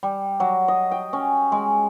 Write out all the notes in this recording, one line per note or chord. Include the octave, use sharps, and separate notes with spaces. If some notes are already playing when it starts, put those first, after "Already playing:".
G3
F#3
D#5
G5
C#4
G#3